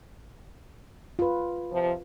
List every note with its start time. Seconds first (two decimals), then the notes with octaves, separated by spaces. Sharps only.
1.19 F4 B4
1.72 C3 F3